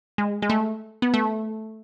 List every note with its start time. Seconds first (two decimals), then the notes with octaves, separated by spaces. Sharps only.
0.18 G#3
0.42 G#3
0.50 A3
1.02 B3
1.14 A3